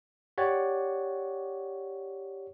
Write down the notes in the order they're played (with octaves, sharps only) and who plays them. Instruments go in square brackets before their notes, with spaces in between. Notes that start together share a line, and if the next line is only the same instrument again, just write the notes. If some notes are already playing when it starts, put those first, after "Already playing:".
[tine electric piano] G4 C#5 D5 F#5